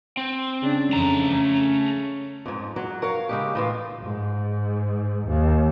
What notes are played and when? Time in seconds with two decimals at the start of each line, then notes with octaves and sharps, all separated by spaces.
0.17 C4
0.63 C#3 D4
0.93 F2 A3 A#5
1.33 C#4
2.46 F2 G#2
2.76 F#3
3.02 A#4 C#5 F5
3.29 C#3 G#3 G4
3.55 A2 E3 F4
4.03 G#2
5.28 D#2